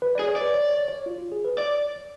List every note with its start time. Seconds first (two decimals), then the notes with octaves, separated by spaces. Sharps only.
0.02 B4
0.15 G#4 D5
0.28 C#5
0.36 D5
0.41 B4
0.54 C#5
0.71 C#5
0.88 C#5
1.06 F4
1.18 F4
1.32 G#4
1.45 B4
1.58 C#5 D5